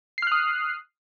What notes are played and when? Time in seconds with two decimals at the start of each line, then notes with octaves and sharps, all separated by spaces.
0.18 C7
0.22 F6
0.27 F#6
0.32 D#6